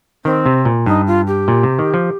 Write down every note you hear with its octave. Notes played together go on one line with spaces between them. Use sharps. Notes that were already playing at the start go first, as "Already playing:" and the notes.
D#3 C4
C3
A#2
G2 D#4
F4
G4
A#2
C3
D#3
F3